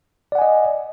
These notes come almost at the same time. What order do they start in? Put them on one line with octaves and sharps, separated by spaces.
D5 F#5 G#5 D#5